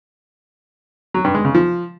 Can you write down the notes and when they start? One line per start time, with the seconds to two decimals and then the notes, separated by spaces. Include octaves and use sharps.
1.14 F#3
1.24 G2
1.34 G#3
1.45 C#3
1.55 F3